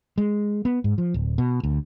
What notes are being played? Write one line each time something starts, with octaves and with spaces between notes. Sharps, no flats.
G#3
B3
G#2
F3
D1
B2
D2